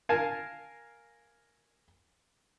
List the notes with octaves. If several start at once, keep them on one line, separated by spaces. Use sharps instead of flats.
A#4 F5 G#5 A5